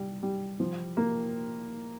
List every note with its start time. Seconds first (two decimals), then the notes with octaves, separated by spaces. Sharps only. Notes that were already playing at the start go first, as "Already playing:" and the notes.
Already playing: G3
0.23 G3
0.60 F3
0.97 A#3